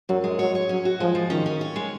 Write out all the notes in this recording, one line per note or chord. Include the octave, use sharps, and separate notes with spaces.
F#2 F#3
G#3
F#3 C#5
C#5
F#3 C#4
F#4
F3 G#3
F3
D#3 C#4
C#4
C#5
G#3